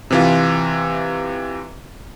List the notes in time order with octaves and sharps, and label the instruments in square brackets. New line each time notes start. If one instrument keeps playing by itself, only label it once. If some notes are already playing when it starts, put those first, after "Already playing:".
[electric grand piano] C3 E3 F4